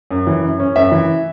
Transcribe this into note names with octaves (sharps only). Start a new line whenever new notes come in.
F#2
E3
F#2
C#4
F#2 E5
E3